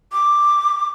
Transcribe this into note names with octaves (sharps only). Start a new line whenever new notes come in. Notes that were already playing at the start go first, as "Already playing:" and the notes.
D6